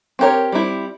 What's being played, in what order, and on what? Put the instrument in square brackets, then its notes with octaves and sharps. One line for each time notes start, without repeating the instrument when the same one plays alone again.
[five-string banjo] C4 G4 A#4 C#5
G3 C4 E4